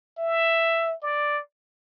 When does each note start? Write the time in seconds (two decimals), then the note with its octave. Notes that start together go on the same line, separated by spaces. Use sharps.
0.18 E5
1.02 D5